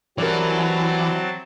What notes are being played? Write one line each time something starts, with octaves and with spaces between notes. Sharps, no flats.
E3 F#3 G3 C4 C#4 F#4 A#4 A5